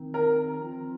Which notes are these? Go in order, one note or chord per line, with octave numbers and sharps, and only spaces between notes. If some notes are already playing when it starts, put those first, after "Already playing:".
Already playing: D#3 C4 D#4
A#4
F3 C4 F4